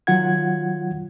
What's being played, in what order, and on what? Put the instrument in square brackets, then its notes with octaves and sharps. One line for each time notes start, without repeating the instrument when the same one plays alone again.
[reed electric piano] D#3 F#3 F4 F#5 G#6